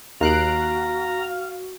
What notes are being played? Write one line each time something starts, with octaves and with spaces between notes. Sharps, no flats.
D#2 F#4 F5 A#5 F#6 D7